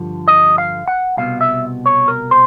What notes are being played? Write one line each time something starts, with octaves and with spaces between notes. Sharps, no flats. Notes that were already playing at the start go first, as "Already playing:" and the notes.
Already playing: G2 D3 F3
D#5
F5
F#5
C2 B2 F5
E5
C#5
A#4
C5